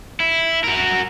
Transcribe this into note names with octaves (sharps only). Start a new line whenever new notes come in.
E4
F#4 A#4